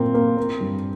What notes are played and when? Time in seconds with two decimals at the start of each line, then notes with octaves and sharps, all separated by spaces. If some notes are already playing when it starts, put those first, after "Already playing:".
Already playing: A#2 A#3 C4
0.14 A#3
0.37 A#3
0.61 G2